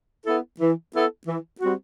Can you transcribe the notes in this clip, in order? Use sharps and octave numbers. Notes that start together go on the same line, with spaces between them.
B3 E4 A4
E3
B3 E4 A4
E3
G3 C4 F#4